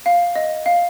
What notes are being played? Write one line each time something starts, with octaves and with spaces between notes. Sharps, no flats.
F5
D#5
F5